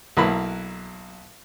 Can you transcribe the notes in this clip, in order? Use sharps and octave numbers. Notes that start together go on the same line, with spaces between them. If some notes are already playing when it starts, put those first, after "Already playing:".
B1 F#3 A#3 E4 B5